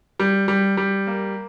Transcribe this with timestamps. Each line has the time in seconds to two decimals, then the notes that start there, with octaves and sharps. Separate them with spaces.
0.20 G3
0.48 G3
0.77 G3
1.07 A#3